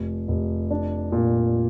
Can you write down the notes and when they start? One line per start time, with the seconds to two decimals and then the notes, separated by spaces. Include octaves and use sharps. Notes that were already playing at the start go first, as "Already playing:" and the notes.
Already playing: F1
0.28 F1
0.71 D4
1.12 A#2